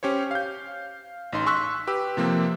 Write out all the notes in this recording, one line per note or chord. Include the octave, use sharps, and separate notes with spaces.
C#4 G4 C5 C#5
F5 G6
A1 D#4 C6
C6 C#6 E6 F#6 B6
G4 B4 E6
C3 F3 A#3 C4